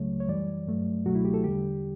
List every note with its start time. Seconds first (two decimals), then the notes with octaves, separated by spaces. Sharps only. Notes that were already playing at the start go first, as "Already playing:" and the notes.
Already playing: C#2 C#3 F#3 A3 C#5
0.20 C#5
0.28 F#2 E3 G3 D5
0.67 G2 F#3 A3
1.05 C#2 B2 F#3 A3 F#4
1.15 E4
1.25 G4
1.34 A4
1.44 E2 D3 G3 G4